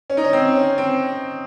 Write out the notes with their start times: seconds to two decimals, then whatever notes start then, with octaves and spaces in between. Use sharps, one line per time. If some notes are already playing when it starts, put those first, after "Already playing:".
0.10 C#4
0.17 D#4
0.24 C#4
0.33 C4
0.55 C#4
0.78 C4